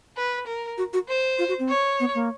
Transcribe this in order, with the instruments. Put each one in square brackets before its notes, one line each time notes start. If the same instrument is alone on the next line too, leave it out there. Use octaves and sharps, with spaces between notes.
[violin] B4
A#4
[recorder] F#4
F#4
[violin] C5
[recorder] F4
F#4
C4
[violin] C#5
[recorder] B3
A#3